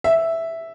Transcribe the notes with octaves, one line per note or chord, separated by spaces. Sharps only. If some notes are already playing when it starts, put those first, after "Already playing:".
E5